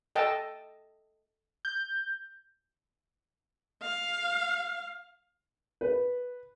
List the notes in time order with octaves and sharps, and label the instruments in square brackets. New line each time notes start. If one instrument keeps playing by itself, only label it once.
[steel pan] A4 D#5 G5 A5
[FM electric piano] G6
[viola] F5
[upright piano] B4